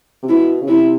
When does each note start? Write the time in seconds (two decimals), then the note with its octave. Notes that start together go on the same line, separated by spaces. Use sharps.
0.22 C3
0.29 B2 E4
0.62 C#3
0.68 C3 E4